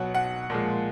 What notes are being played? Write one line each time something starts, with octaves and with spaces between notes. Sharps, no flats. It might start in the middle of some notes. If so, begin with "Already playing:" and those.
Already playing: B2 F#3 F#5
F#5
A#2 F3 G#3